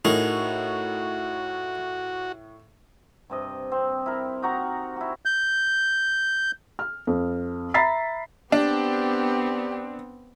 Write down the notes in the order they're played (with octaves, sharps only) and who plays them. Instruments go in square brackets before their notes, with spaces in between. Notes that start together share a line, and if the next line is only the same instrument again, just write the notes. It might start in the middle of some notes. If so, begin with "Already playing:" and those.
[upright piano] A2 [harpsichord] D#4 G#4 A#4 [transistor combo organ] F#4
[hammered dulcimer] G2 C3 D#5
C4
E4 A#4
D#4 F#4 A#5
E4 F#4
[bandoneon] G6
[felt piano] F6
F2
E5 A#5 B5 A6 B6 C7
[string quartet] B3 C4 [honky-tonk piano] D4 [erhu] G4